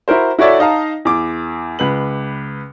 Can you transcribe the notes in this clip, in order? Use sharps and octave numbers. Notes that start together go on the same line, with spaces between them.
E4 F#4 A#4 C5
E4 F#4 A4 C#5 D5 E5
D#4 D#5 F5 A5 A#5
E2 D6
C#2 B4 F#7